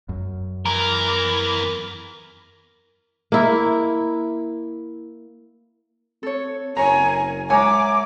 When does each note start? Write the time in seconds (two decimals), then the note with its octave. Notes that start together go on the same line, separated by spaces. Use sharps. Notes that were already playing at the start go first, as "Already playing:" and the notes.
0.09 F#2
0.66 E2 E3 A#4
3.32 A#3 E4
6.23 C4 A4 C#5
6.77 F#1 A#4 C#5 G#5 A#5 C#6
7.50 G#2 C#5 E5 G#5 A#5 D6